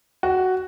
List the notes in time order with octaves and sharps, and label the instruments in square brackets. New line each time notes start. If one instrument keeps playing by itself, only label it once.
[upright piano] F#4